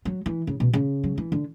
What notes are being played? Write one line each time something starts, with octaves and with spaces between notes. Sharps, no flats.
F#3
E3
C#3
B2
C#3
F#3
E3
D3